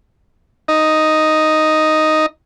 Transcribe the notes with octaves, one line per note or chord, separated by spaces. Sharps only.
D#4 D#5